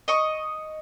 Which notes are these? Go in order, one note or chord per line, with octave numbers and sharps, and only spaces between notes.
D#5 C#6